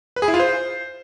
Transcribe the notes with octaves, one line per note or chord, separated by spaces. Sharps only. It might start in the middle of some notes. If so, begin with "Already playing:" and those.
B4
G#4
E4
F4
C5